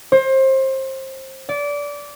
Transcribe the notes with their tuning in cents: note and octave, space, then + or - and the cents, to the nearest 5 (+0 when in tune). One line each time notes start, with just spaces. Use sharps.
C5 +25
D5 -20